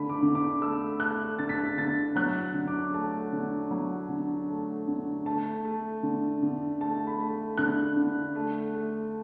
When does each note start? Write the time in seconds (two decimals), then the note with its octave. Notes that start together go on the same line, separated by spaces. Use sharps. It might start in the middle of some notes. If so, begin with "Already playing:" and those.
Already playing: D3 A3 B5
0.09 D6
0.23 D3
0.35 D6
0.61 A3 E6
1.00 A3 F#6
1.39 D3 A6
1.49 B6
1.59 A6
1.77 D3 A6
2.16 F#3 F#6
2.54 D3
2.68 D6
2.94 A3 A5
3.33 D3
3.71 F#3
4.09 D3
4.48 A3
4.88 D3
5.26 A3 A5
5.65 A3
6.03 D3
6.43 D3
6.81 A3 A5
7.07 B5
7.20 A3
7.58 D3 F#6
7.97 D3
8.35 A3
8.74 A3